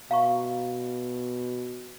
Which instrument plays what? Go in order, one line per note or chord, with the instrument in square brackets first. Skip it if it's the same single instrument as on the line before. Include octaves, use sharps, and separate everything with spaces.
[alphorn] B2 [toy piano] F5 A#5 C#6